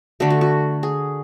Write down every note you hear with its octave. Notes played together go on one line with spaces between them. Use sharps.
D3 A3 F#4
F#4
F#4
G#4